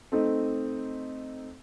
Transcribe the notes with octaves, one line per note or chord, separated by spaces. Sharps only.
A3 C4 D#4